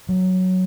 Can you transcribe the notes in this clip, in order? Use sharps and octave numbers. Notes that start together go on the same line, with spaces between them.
F#3